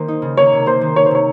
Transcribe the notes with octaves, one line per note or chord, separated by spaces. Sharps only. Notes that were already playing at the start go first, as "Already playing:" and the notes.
Already playing: D#3 A#3 C5
D#4
C#3
A#3 C#5
C3
A#3 C5
D#3
A#3 C#5
C5
C3 C#5